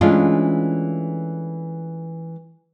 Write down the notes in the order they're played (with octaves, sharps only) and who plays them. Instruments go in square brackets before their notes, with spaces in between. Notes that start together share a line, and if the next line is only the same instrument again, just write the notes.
[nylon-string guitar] E3 G#3 A3 C#4 D4 F4